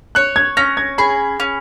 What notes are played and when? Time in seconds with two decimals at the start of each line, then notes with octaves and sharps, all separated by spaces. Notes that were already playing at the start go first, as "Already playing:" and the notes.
0.15 C#5 F#6
0.36 G#6
0.57 C#4 A#6
0.77 G#6
0.98 G#4 B5
1.40 C#4